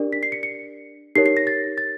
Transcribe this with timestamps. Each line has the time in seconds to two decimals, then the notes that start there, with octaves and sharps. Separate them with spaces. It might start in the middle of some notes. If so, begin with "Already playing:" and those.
Already playing: D4 G4 A#4 D5
0.13 B6
0.23 C7
0.32 C#7
0.43 C#7
1.15 D#4 G4 A#4 C#5 C7
1.26 C7
1.37 A#6
1.47 A6
1.78 A6